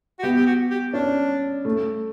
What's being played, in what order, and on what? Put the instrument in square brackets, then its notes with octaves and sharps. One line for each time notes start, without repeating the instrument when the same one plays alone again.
[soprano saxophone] F#4
[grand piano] B3 [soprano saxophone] G4
[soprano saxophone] G4
F#4
G4
[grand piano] C#4 [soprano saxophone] D4
[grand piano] A3